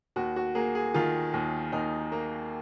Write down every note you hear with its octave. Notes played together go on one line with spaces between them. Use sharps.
D#2 F#4
F#4
A#3 G#4
G#4
D#3 F4
D#2
D#2 D#4
A#3